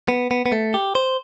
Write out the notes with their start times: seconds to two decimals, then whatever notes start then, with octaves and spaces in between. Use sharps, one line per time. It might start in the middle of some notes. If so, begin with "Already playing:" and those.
0.08 B3
0.31 B3
0.46 B3
0.52 A3
0.74 G4
0.95 C5